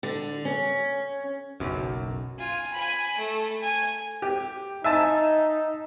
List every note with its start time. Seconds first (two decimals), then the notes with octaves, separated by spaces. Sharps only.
0.03 D3
0.45 C#4
1.60 F#1 B1 F#2
2.39 F4 G#5
2.74 G#5 B5
3.18 A3
3.62 G#5
4.22 G4
4.84 D#4 E5 G#5 A5